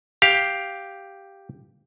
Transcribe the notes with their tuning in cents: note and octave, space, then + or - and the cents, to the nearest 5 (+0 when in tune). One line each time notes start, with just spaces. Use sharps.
G4 +0 F5 +0